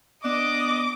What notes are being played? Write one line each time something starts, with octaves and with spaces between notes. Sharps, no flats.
B3 D4 D#5 D6